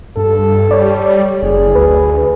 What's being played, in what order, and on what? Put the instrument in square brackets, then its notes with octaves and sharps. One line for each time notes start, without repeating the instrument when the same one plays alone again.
[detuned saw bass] G2 [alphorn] A4
[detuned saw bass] G3 [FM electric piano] C#5 D5
[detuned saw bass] F#1 [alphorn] G#4
[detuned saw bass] D2 [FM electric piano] B4